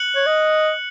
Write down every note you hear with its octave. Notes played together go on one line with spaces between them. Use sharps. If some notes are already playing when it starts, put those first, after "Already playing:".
Already playing: F#6 C#7 F#7
C#5
D#5